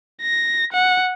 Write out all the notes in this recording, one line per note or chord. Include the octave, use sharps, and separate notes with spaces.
A#6
F#5